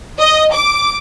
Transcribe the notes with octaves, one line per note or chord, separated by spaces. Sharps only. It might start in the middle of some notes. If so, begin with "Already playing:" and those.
D#5
D6